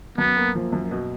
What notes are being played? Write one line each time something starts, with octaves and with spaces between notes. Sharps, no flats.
F#2 B3
A#3
F3
F#2
B2